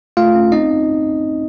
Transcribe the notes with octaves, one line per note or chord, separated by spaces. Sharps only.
A3 F4 F5
C#4
C4 D#4 D#5